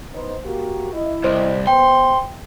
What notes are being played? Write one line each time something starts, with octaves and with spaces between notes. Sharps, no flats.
B3 D#4 C5
A#3 F#4 G4
E4 D#5
C2 C5
B3 C5 G5 C6